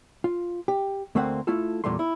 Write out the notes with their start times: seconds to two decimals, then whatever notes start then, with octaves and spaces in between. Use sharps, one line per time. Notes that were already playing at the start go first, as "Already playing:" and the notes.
0.24 F4
0.68 G4
1.15 D2 A3 A#3 C4 C5 F#5
1.47 A3 E4 F4 A4
1.84 E2 A#2 G3 A3 C6
1.99 E4